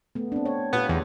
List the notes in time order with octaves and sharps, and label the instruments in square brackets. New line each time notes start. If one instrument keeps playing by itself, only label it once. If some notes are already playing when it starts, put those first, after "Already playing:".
[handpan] A3 B3
C4 D4
C#5
[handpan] A#2 F4 G4 [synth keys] B3
[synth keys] E2